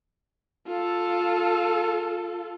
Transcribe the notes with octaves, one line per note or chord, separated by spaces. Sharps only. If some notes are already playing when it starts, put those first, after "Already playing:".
F4 A4